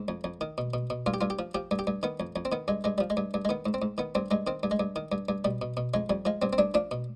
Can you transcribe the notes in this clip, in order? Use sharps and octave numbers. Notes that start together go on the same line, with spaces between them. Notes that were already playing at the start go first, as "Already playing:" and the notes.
Already playing: G#2
F2
F2
D#3
B2
B2
B2
G2 F4
G4
G2 F4
G4
F3
F3 G4
G2
G4
G2
D#3 B3
F2
F2
C4
D#3 B3
G2 G#3
G2 G#3
F3 G3
G#3
G2
G2
G#3
D#3 B3
G#2
C4
G#2
D#3 B3
G2 C4
G2 G#3
D#3 C4
G2
G#3
G2
D#3
G2
G2
B2 G3
B2
B2
F2 G#3
F2 G3
F3 G#3
G2 C4
C4
G2 D4
F3 D4
B2